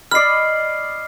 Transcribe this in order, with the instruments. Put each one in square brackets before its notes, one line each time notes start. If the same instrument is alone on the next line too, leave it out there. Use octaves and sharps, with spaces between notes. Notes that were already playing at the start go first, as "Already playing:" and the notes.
[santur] D5 D#5 B5 [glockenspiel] F6 C7